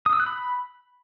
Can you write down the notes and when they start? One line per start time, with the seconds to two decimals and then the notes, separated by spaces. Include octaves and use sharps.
0.06 D#6
0.13 E6
0.20 F#6
0.26 B5